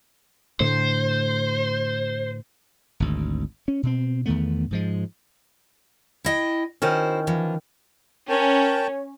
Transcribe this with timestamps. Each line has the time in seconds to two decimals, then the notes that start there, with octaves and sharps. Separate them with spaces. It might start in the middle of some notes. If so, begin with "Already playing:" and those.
0.60 A2 D3 A3 C5
3.00 G#1 D2
3.68 C#4
3.83 B2 C4
4.26 E2 D#3 A3 B3
4.71 G#2 F3 G#3
6.24 E4 D#5 G5
6.82 D#3 C#4 E4 F#4 C5
7.27 E3 F3
8.29 C#4 A#4 C#5 G5 A5